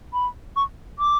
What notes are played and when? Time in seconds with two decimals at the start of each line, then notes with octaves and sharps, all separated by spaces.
0.13 B5
0.56 C#6
0.99 D6